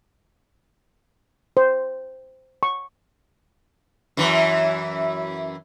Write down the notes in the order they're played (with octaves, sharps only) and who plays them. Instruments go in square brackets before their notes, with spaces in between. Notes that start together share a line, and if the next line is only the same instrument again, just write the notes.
[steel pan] C5
C#6
[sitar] F#2 E3